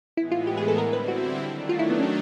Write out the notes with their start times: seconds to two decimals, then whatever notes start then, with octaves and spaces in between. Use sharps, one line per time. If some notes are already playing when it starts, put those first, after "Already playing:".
0.17 A2 E3 G#3 B3 E4
0.32 F4
0.47 G4
0.57 G#4
0.68 A4
0.78 D3 G3 C4 E4 A#4
0.93 B4
1.08 F#4
1.39 D#3 F#3 A3 D4
1.69 F4
1.79 E4
1.90 B3
2.00 C#4